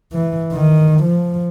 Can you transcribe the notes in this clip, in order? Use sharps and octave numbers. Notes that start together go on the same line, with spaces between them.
E3
D#3
F3